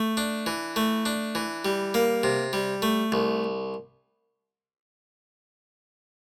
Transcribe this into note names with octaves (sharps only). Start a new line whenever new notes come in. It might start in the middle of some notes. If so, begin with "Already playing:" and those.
Already playing: A3
D4
E3
A3
D4
E3
G3
A#3
C3
G3
A3
C2